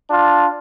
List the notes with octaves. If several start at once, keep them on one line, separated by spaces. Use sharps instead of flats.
D4 F4